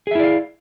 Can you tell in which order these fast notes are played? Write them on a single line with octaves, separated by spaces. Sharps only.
G#4 E5 E4 D5 F5